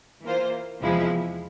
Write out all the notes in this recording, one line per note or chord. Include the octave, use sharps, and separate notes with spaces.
E3 A#3 F4 C5
E2 C3 F3 G#3 E4